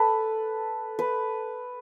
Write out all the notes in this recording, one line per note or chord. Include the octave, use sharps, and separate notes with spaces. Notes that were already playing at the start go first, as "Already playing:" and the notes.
Already playing: A4 B4
B4